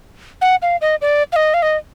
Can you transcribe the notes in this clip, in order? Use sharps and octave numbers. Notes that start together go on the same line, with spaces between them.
F#5
F5
D#5
D5
F5
D#5
F5
D#5